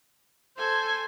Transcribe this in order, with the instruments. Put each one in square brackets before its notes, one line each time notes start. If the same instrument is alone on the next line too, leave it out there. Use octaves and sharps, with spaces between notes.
[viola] A4 G#5 [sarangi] C5